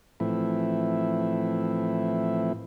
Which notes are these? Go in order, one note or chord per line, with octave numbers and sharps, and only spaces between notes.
A2 E3 F3 A3 C4 E4